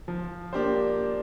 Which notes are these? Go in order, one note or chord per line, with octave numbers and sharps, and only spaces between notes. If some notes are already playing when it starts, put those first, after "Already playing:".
F3
A#3 D4 G4 C5